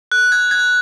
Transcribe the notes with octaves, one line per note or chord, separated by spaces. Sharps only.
F#6
G#6
G#6